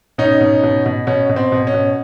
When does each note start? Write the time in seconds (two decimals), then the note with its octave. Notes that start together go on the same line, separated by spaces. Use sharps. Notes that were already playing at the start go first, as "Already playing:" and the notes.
0.18 B2 C#4 D#4
0.41 B2
0.63 B2
0.86 B2
1.07 B2 C#4
1.29 B2
1.36 C4
1.52 B2
1.67 C#4
1.74 B2